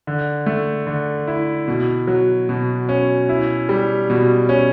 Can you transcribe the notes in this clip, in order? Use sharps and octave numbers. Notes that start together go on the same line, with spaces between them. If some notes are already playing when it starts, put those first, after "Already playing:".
D3
A3
D3
E4
B2
F#3
B2
C#4
E4
G3
B2
C#4